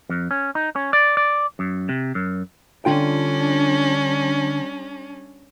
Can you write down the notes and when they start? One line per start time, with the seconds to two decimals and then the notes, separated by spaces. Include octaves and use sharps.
0.09 F2
0.31 C#4
0.55 D#4
0.76 C#4
0.93 D5
1.17 D5
1.59 F#2
1.89 C3
2.15 F#2
2.85 D3 G3 C#4 D4 F4 G5